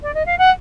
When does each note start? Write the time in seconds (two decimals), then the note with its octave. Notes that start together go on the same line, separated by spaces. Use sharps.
0.03 D5
0.14 D#5
0.26 F5
0.38 F#5